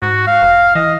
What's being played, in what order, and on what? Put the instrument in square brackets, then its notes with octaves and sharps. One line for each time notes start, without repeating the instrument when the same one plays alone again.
[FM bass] G#2 [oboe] F#4
[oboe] F5
[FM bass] E1
[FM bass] E3 [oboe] D#5